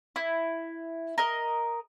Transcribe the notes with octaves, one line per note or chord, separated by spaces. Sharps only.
E4
A#4 D#5